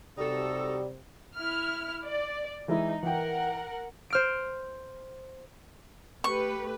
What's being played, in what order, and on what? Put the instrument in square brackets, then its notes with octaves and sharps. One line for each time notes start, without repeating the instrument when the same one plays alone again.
[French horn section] C3 [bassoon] G3 [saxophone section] D#4 F#4 A4
[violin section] E4 F6
D5
[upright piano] E3 G#3 E4 [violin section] D#4
[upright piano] E3 G5 [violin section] A#4 F#5
[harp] C5 F6 D7
[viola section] A3 G4 B4 [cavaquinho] C#6